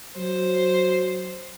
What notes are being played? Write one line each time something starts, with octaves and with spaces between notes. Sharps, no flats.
F#3 C5